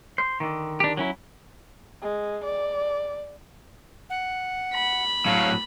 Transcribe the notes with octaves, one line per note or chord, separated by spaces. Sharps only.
C5
D3 D#3
D4 G4
F#3 C#4 E4
G#3
D5
F#5
B5
A2 F#3 F5